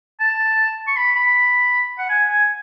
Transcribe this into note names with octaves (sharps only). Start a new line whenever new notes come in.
A5
C#6
B5
B5
F#5
G#5
G#5